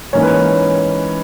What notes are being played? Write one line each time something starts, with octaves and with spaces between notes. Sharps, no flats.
G#2 E3 A#3 C#4 C#5
B4
C#5